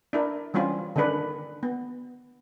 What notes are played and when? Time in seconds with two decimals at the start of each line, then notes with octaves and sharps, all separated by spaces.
0.13 D4 E4 A#4
0.54 E3 G3 C4 C#4 F4
0.96 D3 D#3 C#4 D4 B4
1.63 B3